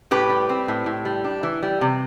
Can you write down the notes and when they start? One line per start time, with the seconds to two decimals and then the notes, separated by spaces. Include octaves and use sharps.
0.11 A2 G4 B4
0.29 G3
0.49 C4
0.68 A2
0.86 A2
1.05 G3
1.24 D4
1.43 E3
1.63 G3
1.81 C3